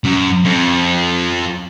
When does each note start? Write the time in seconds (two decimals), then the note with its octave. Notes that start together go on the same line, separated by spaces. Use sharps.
0.04 F#2
0.45 F2